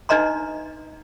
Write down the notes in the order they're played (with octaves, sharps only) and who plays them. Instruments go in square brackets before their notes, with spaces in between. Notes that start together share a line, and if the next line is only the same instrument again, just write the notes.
[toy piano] D4 D#4 B4 D#5 A#5 C6